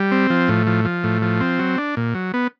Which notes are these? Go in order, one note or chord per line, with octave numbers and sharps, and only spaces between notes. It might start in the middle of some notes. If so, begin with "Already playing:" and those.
Already playing: G3
C4
F3
A2
F3
F3
A2
F3
C4
F#3
D4
A#2
F#3
B3